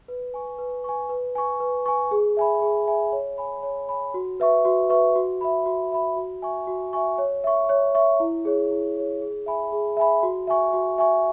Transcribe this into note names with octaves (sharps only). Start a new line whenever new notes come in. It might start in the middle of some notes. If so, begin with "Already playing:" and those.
B4
G#5 C#6
B4
G#5 C#6
B4
G#5 C#6
B4
G#5 C#6
G#4
E5 G#5 B5
G#4
E5 G#5 B5
C#5
G#5 B5
C#5
G#5 B5
F#4
B4 E5 C#6
F#4
B4 E5 C#6
F#4
E5 B5
F#4
E5 B5
F#4
E5 G#5 C#6
F#4
E5 G#5 C#6
C#5
E5 C#6
C#5
E5 C#6
E4
G#4 C#5
E4
G#4 C#5
G#4
E5 G#5 B5
G#4
E5 G#5 B5
F#4
E5 G#5 C#6
F#4
E5 G#5 C#6